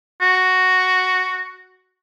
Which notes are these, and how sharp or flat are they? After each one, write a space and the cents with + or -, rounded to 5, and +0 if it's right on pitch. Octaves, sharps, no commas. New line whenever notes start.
F#4 +0